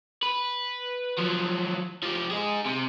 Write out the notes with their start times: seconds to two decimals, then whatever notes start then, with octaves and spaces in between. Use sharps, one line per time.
0.23 B4
1.18 F3 F#3
2.03 F3 G4
2.30 D#4 G#4
2.66 C3